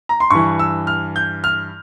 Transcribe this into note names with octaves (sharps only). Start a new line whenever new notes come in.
A#5
C6
G2 E3 C#6
E6
F6
G6
F6